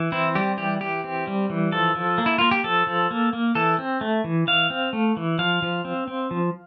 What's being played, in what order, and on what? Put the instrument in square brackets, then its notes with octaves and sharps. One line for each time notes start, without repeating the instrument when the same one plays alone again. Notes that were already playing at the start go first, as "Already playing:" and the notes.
Already playing: [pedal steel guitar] E3
C4 E4
G3 G4
E3 G4
E3 G4
C4
G3
E3
F3 A4
F3
A#3
E4
A#3 F4
G4
F3 A4
F3
A#3
A#3
E3 A4
C4
A3
E3
E3 F5
C4
A3
E3
F3 F5
F3
C4
C4
F3